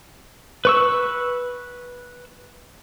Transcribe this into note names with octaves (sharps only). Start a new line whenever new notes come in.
B4 C#6 E6